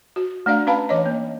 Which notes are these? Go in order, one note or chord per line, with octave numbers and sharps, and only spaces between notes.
F#4
A3 D4 D5 F5
C#4 B4 F5 A5 B5
E3 C#5 D#5
A#3